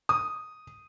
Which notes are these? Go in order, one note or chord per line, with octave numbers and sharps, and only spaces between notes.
D#6